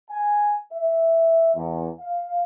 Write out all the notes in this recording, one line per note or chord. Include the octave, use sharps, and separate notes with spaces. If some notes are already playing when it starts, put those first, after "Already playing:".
G#5
E5
E2
F5